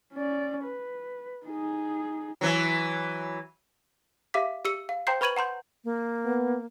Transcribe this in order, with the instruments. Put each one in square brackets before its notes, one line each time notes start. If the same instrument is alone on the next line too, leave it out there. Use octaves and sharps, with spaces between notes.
[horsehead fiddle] C#4 D5
B4
D#4 G#4
[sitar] E3 F#3
[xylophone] G4 E5 F5 D6 B6
G4 E6 C#7
F5
C5 G5 A#5 C6 G6 C7
B4 B5 C#6 G#6 D#7 F#7
F#5 A#5 C6 G6
[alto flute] A#3
[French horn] B3